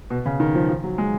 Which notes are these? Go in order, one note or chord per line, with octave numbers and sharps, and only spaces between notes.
B2
C#3
D#3
F3
F3
F#3
G#3